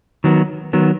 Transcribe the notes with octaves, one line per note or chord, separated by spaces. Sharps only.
D#3 F#3 B3
D#3 F#3 B3